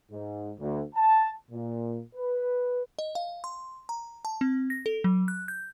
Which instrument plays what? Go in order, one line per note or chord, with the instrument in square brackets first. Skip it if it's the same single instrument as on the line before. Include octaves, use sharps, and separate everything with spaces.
[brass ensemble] G#2
D2
A5
A#2
B4
[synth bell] D#5
F5
C6
A#5
A5
C4
A#6
A4
F#3
F#6
G6